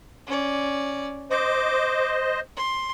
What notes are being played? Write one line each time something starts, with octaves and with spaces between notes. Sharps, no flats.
C#4 D5
C5 D#5 D6
C6